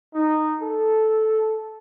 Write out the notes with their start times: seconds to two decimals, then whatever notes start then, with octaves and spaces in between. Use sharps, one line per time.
0.14 D#4
0.62 A4